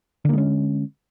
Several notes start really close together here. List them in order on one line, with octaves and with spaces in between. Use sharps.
D3 A#3 G#3 C#4